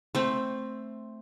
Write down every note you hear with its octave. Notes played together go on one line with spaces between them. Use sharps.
A3 C4